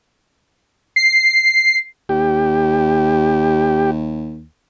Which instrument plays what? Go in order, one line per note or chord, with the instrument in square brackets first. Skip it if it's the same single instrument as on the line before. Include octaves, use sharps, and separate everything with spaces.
[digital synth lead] C7
[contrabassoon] D#2 [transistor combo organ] G4